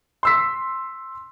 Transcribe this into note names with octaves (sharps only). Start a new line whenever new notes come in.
C6 E6 B6